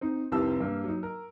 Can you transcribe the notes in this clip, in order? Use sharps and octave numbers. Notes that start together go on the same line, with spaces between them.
C4 D#4
F1 C2 C3 G4 A5 E6
G2 A#3
F#3 D#4
A#4